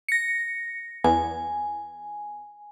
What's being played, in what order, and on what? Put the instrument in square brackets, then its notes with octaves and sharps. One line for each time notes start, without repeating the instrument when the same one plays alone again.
[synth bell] A#6 C#7
[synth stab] E2 [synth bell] G#5